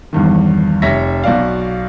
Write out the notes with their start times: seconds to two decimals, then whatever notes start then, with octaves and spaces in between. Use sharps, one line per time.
0.13 E2 G2 D#3
0.82 F1 C#5 E5 A#6 B6
1.24 B1 F#4 D5 F5